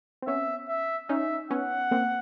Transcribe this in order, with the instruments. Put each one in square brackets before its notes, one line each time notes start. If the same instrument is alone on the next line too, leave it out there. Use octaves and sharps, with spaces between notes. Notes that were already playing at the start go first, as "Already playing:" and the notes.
[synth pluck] C4
[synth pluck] B3 C#4 [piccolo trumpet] E5
[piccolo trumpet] E5
[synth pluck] C#4 D#4 [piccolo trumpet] E5
[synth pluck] B3 C#4 [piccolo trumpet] F#5
[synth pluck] A#3 C4